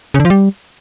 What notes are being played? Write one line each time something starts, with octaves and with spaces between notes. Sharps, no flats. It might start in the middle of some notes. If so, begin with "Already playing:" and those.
C#3
D3
F3
G3